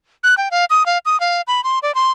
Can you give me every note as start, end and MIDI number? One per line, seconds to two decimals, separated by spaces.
0.24 0.35 90
0.38 0.49 79
0.51 0.65 77
0.70 0.86 87
0.86 0.98 77
1.06 1.19 87
1.20 1.41 77
1.47 1.63 83
1.64 1.79 84
1.83 1.94 74
1.95 2.11 84